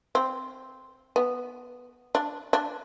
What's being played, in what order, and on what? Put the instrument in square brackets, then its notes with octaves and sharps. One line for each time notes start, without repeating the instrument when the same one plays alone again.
[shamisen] C4
B3
D4
D4